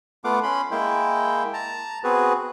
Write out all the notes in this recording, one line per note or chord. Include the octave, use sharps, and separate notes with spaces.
A3 B3 F4 F5 F#5 D6
C#4 B5 C6
G#3 A#3 E4 G5
A5 A#5
B3 C4 F#4 G#4 B4